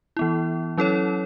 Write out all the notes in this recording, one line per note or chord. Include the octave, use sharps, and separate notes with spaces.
E3 B3 E4
F#3 C#4 E4 A4 C#5